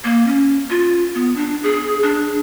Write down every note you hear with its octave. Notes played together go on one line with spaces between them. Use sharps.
A#3
C#4
F4
B3
D4
G#4
D4